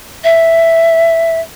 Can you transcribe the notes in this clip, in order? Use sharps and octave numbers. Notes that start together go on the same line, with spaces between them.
E5